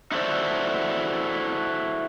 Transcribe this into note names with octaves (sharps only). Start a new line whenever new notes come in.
D#4 E4 F#4 A4 C5 D5